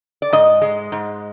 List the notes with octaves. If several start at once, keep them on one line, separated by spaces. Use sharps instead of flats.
D5
G#2 D#5
G#3
G#2